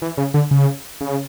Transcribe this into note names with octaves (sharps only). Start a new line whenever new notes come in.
E3
C#3
D3
C#3
C#3